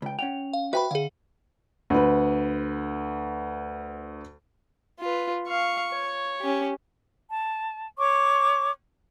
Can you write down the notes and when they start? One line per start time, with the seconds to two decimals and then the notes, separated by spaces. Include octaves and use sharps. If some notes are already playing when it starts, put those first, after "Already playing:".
0.02 C#2 G5
0.19 C#4 F#5 G5 F7
0.53 F5
0.73 F#4 B4 C5 E5 G5 B5
0.91 D3 G#4 F5
1.90 D2 B4
5.00 F4 B4
5.48 F5 C#6
5.91 C#5
6.41 C#4 G4
7.29 A5
7.99 C#5 C#6 D6